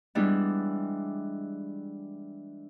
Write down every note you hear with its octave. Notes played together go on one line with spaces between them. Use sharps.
E3 G3 G#3 B3 D4 E4